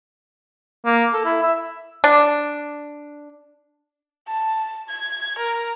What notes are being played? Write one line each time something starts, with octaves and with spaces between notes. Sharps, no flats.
A#3
A4
E4
E5
D4
A5
G#6
A#4